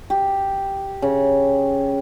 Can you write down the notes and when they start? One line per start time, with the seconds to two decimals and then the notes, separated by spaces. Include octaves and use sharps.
0.10 G4
1.02 C#3